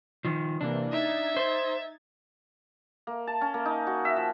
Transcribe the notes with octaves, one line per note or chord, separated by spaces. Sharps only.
D#3 F3
C3 E3 A#3 D4
D#4 E5 G#6 A6
C5
A#3
A5
C#4
A#3
D#4
F#4
E5
F3